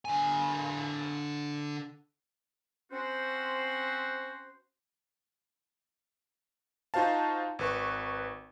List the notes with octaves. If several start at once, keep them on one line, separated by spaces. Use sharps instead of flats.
D3 G#5
C4 C#4 F#4 C5
D#4 F4 F#4 C5 F5 A5
G#1 B4 C#6